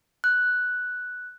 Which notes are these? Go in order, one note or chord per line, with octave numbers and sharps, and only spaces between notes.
F#6